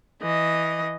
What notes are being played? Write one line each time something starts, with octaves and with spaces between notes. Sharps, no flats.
E3 D#5